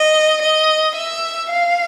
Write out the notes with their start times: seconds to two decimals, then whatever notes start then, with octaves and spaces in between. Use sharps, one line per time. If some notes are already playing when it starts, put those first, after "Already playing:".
Already playing: D#5
0.42 D#5
0.96 E5
1.50 F5